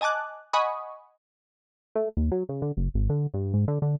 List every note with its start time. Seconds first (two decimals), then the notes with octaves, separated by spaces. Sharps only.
0.01 D#5 G#5 A5 D6 F#6
0.53 D#5 F#5 G#5 B5 C#6 D#6
1.95 A3
2.17 D#2
2.32 F#3
2.49 C#3
2.62 D3
2.77 F#1
2.94 G#1
3.10 D3
3.34 G2
3.54 G#2
3.68 D3
3.82 D3